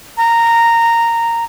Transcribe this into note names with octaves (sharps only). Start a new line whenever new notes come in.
A#5